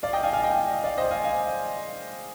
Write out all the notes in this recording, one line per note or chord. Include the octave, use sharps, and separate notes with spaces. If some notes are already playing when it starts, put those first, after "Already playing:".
D5 F5
D#5 G5
F5 G#5
F5 G#5
D#5 G5
D5 F5
C5 D#5
F5 G#5
F5 G#5